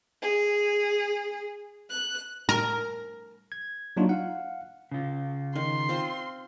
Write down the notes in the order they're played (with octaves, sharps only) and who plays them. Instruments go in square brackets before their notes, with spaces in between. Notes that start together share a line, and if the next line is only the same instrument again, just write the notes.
[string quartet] G#4
F#6
[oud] A#4
[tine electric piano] G#6
F#3 A#3 D4 D#4 F4 F#4
F5 F#5
[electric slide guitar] C#3 F4
[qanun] D#3 [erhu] C6
[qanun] C4 F4 C5